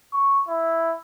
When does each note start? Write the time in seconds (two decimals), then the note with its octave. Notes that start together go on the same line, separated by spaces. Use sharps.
0.13 C#6
0.48 E4